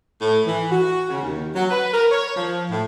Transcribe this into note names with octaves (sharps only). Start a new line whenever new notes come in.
A2
E3
F#4
C#3
D#2
F#3
B4
A#4
C#5
F3
A2